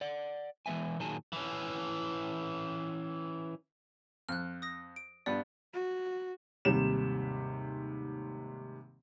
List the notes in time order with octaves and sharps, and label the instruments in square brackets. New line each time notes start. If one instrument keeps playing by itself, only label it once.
[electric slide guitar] D5 F#5
E3 G#3 B3 E5 G#5
A#2 D#3 F#3 G#4 G#5 A5
[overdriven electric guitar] E3 C#4
[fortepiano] F2 [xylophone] F6 F#6
[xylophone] D#6 A#6
D7
[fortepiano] G2 B3 [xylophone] D5
[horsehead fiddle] F#4
[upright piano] D#2 G#2 C3 G3 E7